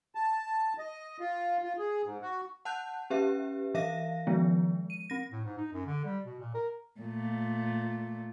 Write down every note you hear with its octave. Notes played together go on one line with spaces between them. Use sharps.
A5
D#5
F4
F4
G#4
G#2
F#4
F#5 A5 F#6 G6
C#4 G4 B4 E5
E3 E5 F5 A#6
D#3 F3 G#3 B3
D#7
C4 A#6
A2
G#2
D#4
F#2
D3
G3
B2
A#2
A#4
A#2 A3